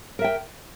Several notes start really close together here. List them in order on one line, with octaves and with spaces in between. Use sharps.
A#4 E5 G5